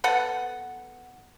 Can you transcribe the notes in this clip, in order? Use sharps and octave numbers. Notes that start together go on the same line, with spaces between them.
B3 A4 F#5